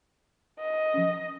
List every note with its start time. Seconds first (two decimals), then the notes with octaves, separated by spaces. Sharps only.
0.59 D#5
0.94 F3 C#4